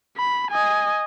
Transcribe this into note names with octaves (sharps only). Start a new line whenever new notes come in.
B5
D#5 G#5